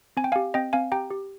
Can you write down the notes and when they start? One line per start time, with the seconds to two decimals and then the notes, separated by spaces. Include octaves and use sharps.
0.17 C4 G#5
0.24 G5
0.32 G4 F5 G#5
0.54 C4 D#5 G5
0.73 C4 F5 G#5
0.92 G4 G5 A#5
1.11 G4